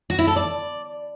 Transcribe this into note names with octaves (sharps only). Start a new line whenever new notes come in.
F#4
E4
A4
D5